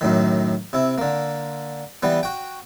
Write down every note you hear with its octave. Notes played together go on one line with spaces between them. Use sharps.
F#2 A2 D#3
C3 E4
D3 A#3
E3 G3 B3
F#4 G5